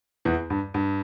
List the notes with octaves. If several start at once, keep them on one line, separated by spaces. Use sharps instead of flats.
E2 E3
G2
G2